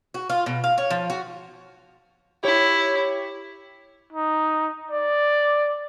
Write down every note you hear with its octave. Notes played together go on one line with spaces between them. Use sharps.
F#4
F4
B2
F5
C#5
F3
F#4
E4 G4 C#5
D#4
D5